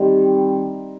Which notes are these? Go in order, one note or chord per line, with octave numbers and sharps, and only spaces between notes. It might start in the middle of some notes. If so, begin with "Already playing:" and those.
Already playing: D#3 G3 C4